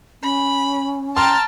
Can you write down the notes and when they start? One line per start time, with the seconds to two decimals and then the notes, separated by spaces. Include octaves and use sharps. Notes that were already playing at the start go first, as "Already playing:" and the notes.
0.23 C#4 B5
1.17 G5 A5 A#5 C6 F6